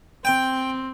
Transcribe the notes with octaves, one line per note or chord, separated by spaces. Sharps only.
C4 G5